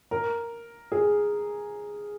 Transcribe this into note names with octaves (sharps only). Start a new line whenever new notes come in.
A#4
G#4